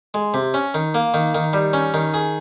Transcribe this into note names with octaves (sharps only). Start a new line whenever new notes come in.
G#3
C3
C#4
D#3
A#3
D#3
D#3
G3
C#4
D#3
G#4